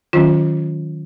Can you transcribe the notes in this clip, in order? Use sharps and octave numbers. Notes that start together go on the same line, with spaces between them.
D#3 F#3 C#4 F4